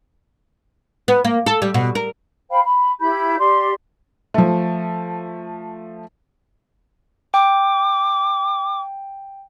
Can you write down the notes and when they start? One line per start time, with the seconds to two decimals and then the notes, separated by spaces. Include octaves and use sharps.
1.08 B3
1.25 A#3
1.46 A4
1.62 G3
1.74 B2
1.95 A#4
2.50 C5 F5 G5 B5
2.65 B5
3.00 E4 G4 B5 G6
3.38 G4 D5 C6
4.34 F3 A3
7.34 G5 D6